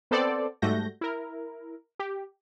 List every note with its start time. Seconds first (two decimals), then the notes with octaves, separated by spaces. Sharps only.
0.11 B3 C4 A4 C5 D5
0.62 G#2 G3 A3 F#4 G6 A#6
1.01 E4 A#4
1.99 G4